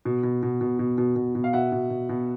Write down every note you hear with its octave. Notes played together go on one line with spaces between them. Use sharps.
B2
B2
B2
B2
B2
B2
B2
B2
F5
B2 E5 F#5
B2
B2
B2